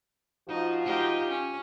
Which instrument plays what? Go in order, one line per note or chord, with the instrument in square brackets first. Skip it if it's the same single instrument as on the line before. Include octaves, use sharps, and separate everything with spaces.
[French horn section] F3 F#4 [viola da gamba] D#4
[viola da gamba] D#4 F4 G4
C#4